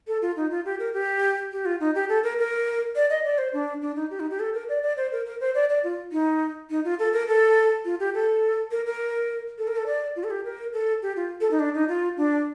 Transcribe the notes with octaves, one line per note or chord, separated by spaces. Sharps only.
A4
F4
D#4
F4
G4
A#4
G4
G4
F4
D#4
G4
A4
A#4
A#4
D5
D#5
D5
C5
D4
D4
D#4
G4
D#4
G4
A4
A#4
D5
D5
C5
A#4
A#4
C5
D5
D5
F4
D#4
D#4
F4
A4
A#4
A4
F4
G4
A4
A#4
A#4
A4
A#4
A4
D5
F4
A4
G4
A#4
A4
G4
F4
A4
D#4
D4
D#4
F4
D4